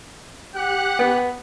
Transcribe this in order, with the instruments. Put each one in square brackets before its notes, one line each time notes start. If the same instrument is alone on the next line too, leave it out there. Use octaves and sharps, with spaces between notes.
[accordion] G4 F#6 [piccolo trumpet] F#5
[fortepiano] B3